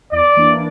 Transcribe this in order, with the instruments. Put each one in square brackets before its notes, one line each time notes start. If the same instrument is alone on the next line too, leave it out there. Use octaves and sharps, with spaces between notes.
[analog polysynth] E2 [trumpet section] D5
[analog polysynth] E3 A#3 D4